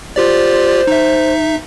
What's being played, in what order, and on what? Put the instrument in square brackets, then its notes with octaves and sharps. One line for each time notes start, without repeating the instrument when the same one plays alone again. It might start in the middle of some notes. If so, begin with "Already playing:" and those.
[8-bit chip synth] F4 G4 D5 [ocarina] C5
[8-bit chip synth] D#4 E5